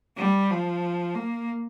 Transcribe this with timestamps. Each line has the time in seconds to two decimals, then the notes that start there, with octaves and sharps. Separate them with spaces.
0.17 G3
0.50 F3
1.15 A#3